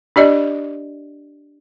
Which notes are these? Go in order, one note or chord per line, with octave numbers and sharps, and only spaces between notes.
D4 G4 D5 D#5